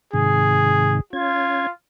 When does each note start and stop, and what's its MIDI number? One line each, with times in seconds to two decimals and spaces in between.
0.14 1.00 44
0.14 1.00 48
0.14 1.00 51
0.14 0.97 68
1.13 1.67 61
1.13 1.71 65
1.13 1.67 92